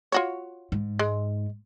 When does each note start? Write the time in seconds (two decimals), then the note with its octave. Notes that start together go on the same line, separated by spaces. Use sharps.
0.12 F4 F#4 C#5
0.72 G#2
0.99 G#3